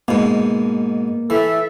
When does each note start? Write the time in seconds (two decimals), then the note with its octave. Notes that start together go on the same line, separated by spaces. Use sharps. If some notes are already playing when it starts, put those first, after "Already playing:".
0.08 G#2 B2 A#3
1.30 E3 A4 E5